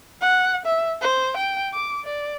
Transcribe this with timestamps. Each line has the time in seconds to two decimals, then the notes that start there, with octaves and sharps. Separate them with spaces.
0.22 F#5
0.66 E5
1.02 C5
1.37 G5
1.73 D6
2.05 D5